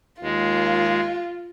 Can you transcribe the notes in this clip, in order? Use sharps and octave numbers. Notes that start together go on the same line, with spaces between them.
D#2 G#3 F4